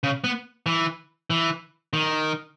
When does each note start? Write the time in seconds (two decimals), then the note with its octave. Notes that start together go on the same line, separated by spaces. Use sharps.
0.03 C#3
0.24 B3
0.66 E3
1.30 E3
1.93 D#3